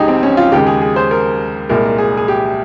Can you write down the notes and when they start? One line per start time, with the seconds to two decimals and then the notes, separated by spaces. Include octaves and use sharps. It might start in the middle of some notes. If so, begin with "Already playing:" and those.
Already playing: C#2 C#3 G#3 D#4 G4 G#4
0.08 C4
0.23 C#4
0.37 F4
0.52 D#2 C#3 G#3 G4
0.67 G#4
0.82 G#4
0.96 C5
1.11 A#4
1.69 C2 A#2 G#3 A#4
1.98 G#4
2.17 G#4
2.28 G4